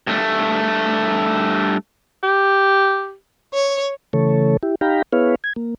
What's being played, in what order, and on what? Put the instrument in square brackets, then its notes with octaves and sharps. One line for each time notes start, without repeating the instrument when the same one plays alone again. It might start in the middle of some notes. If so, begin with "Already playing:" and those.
[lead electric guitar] G2 A3
[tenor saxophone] G4
[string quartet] C#5
[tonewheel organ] C#3 E3 A3 A4 C#5
E4 G4
D#4 G4 F5 G5 A#5 B5
B3 E4 G#4 B4 C#5 F5
G#6
A#3